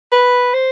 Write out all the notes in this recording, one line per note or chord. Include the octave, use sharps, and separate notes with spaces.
B4
C5